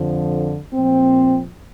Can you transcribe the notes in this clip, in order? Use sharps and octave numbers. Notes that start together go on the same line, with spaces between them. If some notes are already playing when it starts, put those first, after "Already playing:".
Already playing: F2 D3 F3
A#2 F3 C4